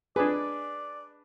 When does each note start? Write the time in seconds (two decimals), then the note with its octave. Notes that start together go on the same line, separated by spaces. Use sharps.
0.16 D4 G#4 B4 D5